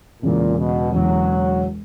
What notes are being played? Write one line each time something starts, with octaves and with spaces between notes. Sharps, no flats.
E1 E2 A#2 C#3
B2
E1 E2 C#3 F#3